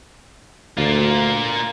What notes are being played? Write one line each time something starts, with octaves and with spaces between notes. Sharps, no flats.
D2 A#3 F4